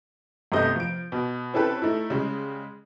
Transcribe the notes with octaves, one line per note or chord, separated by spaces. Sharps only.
G1 C3 G3 A3 D#5 G6
F3 D7
B2
C4 C#4 E4 G4 A4 B4
A3 D#4 E4
C#3 G3 G#3